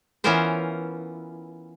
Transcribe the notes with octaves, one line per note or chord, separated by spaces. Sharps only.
E3 B3 C#4 F4 A#4 C5